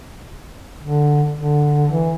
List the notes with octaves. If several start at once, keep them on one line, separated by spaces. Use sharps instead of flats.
D3
D3
E3